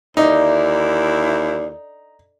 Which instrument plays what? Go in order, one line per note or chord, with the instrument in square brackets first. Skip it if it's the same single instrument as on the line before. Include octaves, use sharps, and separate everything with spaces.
[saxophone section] D#2 E4 [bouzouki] D3 [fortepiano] D#4